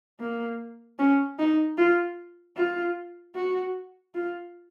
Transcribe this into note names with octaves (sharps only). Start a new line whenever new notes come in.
A#3
C#4
D#4
F4
F4
F#4
F4